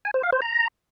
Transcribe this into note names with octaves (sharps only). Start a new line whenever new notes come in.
G#5
C5
F5
C5
A#5